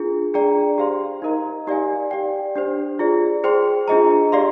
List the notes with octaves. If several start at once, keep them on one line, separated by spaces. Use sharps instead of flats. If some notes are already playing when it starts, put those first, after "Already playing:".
Already playing: D4 F4 G#4
D4 G#4 D5 G5 A#5
G4 C5 F5 C6
D#4 A#4 D#5 A#5
D#4 G4 D5 F5 G#5
G4 D5 G5
D4 G4 C5
F4 G#4 D5
G#4 C5 G5 C6
D4 F4 G#4 D#5 A#5
G4 D5 F5 C6